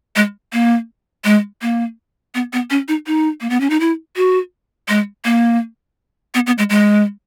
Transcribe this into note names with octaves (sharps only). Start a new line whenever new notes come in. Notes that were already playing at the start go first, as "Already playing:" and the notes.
G#3
A#3
G#3
A#3
B3
B3
C#4
D#4
D#4
A#3
B3
C#4
D#4
E4
F#4
G#3
A#3
B3
B3
G#3
G#3